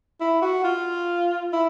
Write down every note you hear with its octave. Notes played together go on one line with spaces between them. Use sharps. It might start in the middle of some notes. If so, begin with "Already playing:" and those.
E4
F#4
F4
E4